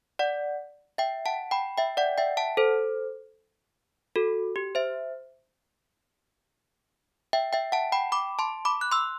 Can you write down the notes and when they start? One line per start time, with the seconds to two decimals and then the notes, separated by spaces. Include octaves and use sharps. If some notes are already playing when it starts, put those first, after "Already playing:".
0.19 D5 F#5
0.98 E5 G5
1.26 F#5 A5
1.51 G5 B5
1.77 E5 G5
1.97 D5 F#5
2.18 E5 G5
2.37 F#5 A5
2.57 A4 C5
4.16 F#4 A4
4.56 G4
4.75 C5 E5
7.33 E5 G5
7.53 E5 G5
7.72 F#5 A5
7.92 G5 B5
8.12 B5 D6
8.39 A5 C6
8.65 B5 D6
8.81 F#6
8.92 C6 E6